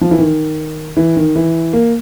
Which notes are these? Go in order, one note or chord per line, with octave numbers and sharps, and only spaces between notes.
F3
E3
D#3
E3
D#3
E3
A#3